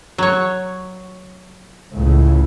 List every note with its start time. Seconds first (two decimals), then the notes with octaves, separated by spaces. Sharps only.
0.18 F#3 C#5
1.92 C#2 A2